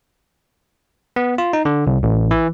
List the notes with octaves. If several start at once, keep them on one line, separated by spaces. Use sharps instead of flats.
B3
F4
D#4
D3
C2
A1
E3